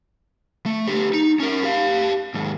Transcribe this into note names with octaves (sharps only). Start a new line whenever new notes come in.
A3
D3 G4
D#4
C#4 A#4
G4 F5
D#2 G#2